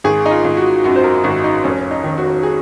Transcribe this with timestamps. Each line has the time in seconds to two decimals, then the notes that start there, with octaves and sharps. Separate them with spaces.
0.04 G#1 G#4
0.26 D#4
0.31 F4
0.44 G#1
0.57 F#4
0.84 F#2 F#4
0.96 C5
1.04 A#4
1.24 G#1 F#4
1.44 D#4
1.64 F1 C#4
1.91 D#4
2.04 D#3
2.18 F#4
2.43 G#4